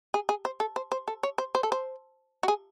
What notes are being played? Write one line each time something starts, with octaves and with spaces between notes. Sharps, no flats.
G#4
G#4
C5
A4
C5
C5
A4
C#5
C5
C5
A4
C5
F#4
G#4